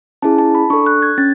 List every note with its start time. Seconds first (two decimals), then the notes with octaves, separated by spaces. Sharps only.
0.22 C#4 E4 G#4 A5
0.38 A5
0.55 B5
0.70 D4 A4 C#6
0.86 F#6
1.02 G#6
1.18 C#4 A6